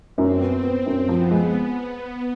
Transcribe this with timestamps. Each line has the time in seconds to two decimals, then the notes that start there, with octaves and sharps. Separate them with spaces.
0.18 F#2 C4
0.41 B3
0.63 B3 C4
0.86 F#2
1.08 F3 B3
1.31 G#3